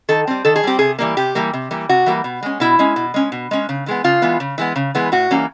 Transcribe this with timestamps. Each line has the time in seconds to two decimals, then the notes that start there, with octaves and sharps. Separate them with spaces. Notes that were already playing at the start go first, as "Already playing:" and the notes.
0.09 D#3 A4
0.27 G3 C4
0.45 D#3 A4
0.56 G#4
0.63 G3 C4 G4
0.79 C3 G#4
0.99 E3 G3 A#3
1.17 C3 G4
1.35 E3 G3 A#3
1.53 C3
1.71 E3 G3 A#3
1.89 C3 F#4
2.06 E3 G3 A#3
2.24 B2
2.42 G#3 C#4
2.60 B2 E4
2.79 G#3 C#4
2.96 B2
3.14 G#3 C#4
3.32 B2
3.51 G#3 C#4
3.69 C#3
3.86 E3 G#3 B3
4.04 C#3 F4
4.22 E3 G#3 B3
4.40 C#3
4.58 E3 G#3 B3
4.76 C#3
4.95 E3 G#3 B3
5.12 A2 F#4
5.31 E3 G3 A#3 C#4